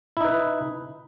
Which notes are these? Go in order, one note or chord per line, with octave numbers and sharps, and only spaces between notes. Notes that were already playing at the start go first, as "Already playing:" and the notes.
D#4 E4 B4